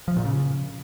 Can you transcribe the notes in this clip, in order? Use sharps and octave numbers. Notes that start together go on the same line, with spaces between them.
F3
A#2
C#3